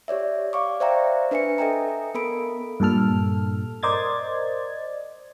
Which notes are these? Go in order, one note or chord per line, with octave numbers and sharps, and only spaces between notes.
G4 C#5 D5 E5
D5 F5 C#6 D6
C5 D5 E5 F5 G5 A#5
D4 B4 E5 G#5 C#7
A4 D#5 E5 G5 G#5 A#5
B3 A4 A#4 B5 D7
G2 A#2 A4 F6
A#4 C5 D5 D#5 G#6 A6